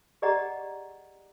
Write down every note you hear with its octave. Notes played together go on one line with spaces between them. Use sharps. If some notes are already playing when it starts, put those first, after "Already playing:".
G4 G#4 D5 D#5 F#5 A#5